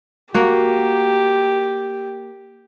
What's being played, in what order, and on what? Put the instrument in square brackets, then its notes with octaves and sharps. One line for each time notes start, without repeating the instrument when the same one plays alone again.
[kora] A#3 F#4 [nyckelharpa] G4